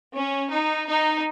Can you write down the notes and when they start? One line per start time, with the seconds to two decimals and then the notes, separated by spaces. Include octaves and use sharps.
0.15 C#4
0.51 D#4
0.87 D#4